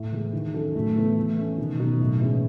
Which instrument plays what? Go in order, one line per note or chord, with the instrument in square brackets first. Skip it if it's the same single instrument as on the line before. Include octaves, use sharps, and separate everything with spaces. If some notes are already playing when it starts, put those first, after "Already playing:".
Already playing: [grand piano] A2
E3 G#3
D#3
F#3 C#4 F#4 A4
[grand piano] A2 [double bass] A3
[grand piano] E3 B3 E4 A4
E3
A3 C#4
[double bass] B2 [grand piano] D#3
[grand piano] F#3 B3 D#4 F#4
A2
E3 G#3 C#4